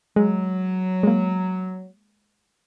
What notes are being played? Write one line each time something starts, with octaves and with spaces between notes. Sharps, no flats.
F#3 G#3
G#3 A#3